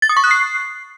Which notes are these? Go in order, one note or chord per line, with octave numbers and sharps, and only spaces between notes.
A6
D#6
C#6
F#6
C7